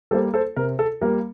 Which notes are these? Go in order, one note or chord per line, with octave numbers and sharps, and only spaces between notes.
G3 A#3 A4 C5
A4 C5
C3 A#4
A4
G3 A#3 A#4